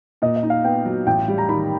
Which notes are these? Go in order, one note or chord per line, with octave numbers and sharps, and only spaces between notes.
A#2 D#5
D#5
D#4
F5
B3 G5
F#3
A1 G5
G3
A#5
D#3 B5